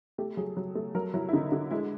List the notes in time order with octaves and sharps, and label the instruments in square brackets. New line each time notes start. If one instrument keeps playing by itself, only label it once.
[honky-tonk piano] A3 G4
F#3 G#4
F#3
A3
F#3 A#4
F#3 E4
E4
D3 D#4
D3
G#3 E4